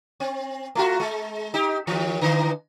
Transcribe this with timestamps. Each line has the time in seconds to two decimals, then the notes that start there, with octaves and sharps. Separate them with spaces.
0.20 C4
0.75 A3 F4 F#4
1.00 G#3
1.54 D#4 G4
1.87 D#2 E3
2.21 D3 E3